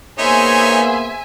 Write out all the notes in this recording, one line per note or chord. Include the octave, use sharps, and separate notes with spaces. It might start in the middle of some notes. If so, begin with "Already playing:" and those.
A#3 B3 D#4 G#4 C5 C#5 E5 G#5